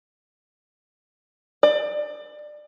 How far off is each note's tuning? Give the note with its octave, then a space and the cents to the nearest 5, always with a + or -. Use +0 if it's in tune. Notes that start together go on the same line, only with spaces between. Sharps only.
D5 +25